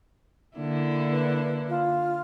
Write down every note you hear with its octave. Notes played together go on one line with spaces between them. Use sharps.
D3 A#3 E4
B4
F4